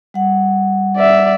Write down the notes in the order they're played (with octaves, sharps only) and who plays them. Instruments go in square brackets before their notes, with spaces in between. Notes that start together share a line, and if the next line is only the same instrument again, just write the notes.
[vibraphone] G3 F#5
[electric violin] D5 E5